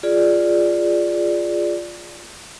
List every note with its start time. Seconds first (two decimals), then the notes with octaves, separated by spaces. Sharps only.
0.03 F4 G#4 D5